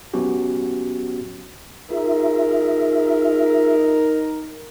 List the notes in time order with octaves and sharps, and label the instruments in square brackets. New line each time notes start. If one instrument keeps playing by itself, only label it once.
[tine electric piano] F#3 B3 C#4 F#4 G4
[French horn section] D#4 A#4 [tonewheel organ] F4 G#4 E5